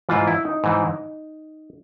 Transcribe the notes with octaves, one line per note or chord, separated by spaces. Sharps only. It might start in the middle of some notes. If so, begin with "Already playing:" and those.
G#2 E3 F4
E4
D#4
G#2 E3